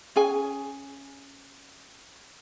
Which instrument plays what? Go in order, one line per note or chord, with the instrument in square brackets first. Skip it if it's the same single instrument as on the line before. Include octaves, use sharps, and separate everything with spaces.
[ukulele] C#4 G#4 G#5